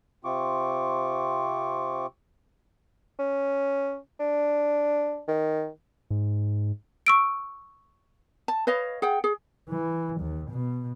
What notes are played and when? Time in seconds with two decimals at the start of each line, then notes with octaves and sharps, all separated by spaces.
0.24 C3 C4 F4 C#6 D6
3.19 C#4
4.20 D4
5.28 D#3
6.10 G#2
7.06 C#6 E6 D7
8.48 A5
8.67 B4 C#5 D#5 F5
9.02 G#4 F#5 G5
9.24 G#4
9.69 E3
10.21 D#2
10.51 B2